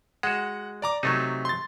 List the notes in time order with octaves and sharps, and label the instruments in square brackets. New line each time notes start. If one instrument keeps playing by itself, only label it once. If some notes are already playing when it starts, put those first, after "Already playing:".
[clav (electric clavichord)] G#3 F#4 [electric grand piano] F#5
[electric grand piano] D5 A#5 D6
[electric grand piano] C3 [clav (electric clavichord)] F#3 A3 D#4
[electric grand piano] C6 A6